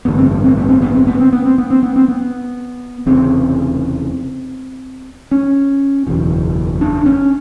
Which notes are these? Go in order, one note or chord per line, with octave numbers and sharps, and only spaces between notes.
A1 G2 D3 B3
C4
B3
C4
B3
C4
B3
C4
B3
C4
B3
C4
B3
C4
B3
C4
B3
F1 E2 C#3 C4
C#4
F#1 E2 B2
D4
C#4